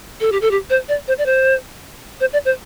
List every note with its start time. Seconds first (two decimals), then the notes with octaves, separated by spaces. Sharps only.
0.20 A4
0.32 G4
0.41 A4
0.51 G4
0.70 C5
0.88 D5
1.08 C5
1.18 D5
1.26 C5
2.20 C5
2.33 D5
2.45 C5